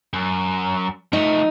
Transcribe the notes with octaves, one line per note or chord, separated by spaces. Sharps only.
F#2
F3 A3 D#4